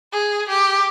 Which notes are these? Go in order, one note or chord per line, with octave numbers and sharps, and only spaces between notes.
G#4
G4